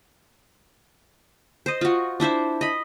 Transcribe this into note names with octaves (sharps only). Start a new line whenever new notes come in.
C5 D#5
F4 F#4
D4 E4 C5 E5
D#5 B5